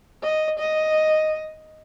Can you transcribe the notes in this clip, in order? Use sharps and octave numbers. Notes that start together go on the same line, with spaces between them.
D#5
D#5